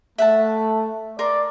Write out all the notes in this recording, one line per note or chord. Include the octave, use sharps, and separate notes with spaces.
A3 E5 F#5 A5
A#4 D5 C6